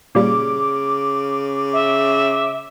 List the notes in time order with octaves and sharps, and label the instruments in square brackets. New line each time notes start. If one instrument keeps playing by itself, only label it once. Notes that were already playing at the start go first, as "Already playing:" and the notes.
[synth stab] A#2 G3 [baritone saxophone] C#3 [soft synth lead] D6
[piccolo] E5